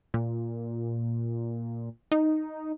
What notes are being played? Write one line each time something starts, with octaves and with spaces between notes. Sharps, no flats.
A#2
D#4